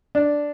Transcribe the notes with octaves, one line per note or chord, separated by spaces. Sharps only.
D4